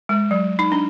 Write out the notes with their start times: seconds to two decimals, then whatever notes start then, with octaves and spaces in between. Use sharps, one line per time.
0.09 G#3
0.31 F#3
0.59 D#4
0.72 D4